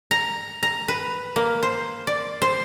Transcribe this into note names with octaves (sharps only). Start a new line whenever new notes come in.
A#5
A#5
B4
A#3
C5
D5
C5